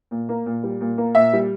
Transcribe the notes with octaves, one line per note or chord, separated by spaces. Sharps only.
A#2
A#3
A#2
G3
A#2
A#3
A#2 E5
G3